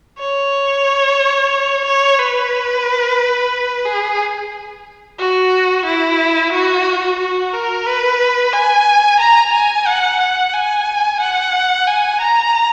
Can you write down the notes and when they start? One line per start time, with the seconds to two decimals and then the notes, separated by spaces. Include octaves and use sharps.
0.19 C#5
1.86 C#5
2.19 B4
3.86 G#4
5.19 F#4
5.86 E4
6.53 F#4
7.19 F#4
7.53 A#4
7.87 B4
8.54 G#5
9.20 A#5
9.53 G#5
9.87 F#5
10.20 F#5
10.54 G#5
11.20 F#5
11.87 G#5
12.21 A#5